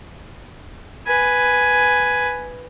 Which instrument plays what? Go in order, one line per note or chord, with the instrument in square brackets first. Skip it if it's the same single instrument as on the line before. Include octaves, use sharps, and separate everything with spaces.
[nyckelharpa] B4 G#5